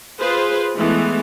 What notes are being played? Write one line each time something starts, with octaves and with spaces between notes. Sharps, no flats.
F4 G#4 B4 C5
E3 G#3 A3 B3